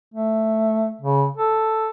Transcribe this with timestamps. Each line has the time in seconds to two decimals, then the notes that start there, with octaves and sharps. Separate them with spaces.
0.14 A3
1.01 C#3
1.37 A4